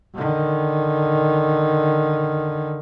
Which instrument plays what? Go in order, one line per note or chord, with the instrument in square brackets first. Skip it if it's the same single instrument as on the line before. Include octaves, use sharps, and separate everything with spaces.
[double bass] D3 D#3